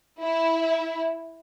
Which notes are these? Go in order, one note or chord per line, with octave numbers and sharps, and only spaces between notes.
E4